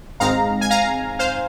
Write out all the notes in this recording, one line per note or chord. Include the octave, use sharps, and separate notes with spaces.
G#1 G#2 G#3 C4 D#4 F5 A#5
G#5
F5 A#5
C5 F5